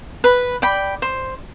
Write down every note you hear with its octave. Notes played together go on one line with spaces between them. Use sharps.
B4
D5 G5 B5
C5